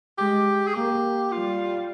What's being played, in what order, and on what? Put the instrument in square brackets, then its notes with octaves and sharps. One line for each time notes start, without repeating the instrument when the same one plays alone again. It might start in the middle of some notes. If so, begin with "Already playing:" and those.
[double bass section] G#3 [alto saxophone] G4
[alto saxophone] G#4
[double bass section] A#3 [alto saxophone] G4
[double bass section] G3 [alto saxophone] F4